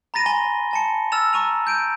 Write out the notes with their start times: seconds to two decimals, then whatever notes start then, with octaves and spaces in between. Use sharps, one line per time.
0.14 A#5 B5 A6 A#6 D#7
0.26 G#5 C6 A#6 G7
0.71 G#5 A5 C#7
1.12 E6 F6 A6 E7 F7
1.33 A#5 C#6 D#7 F7
1.67 G6 D7 D#7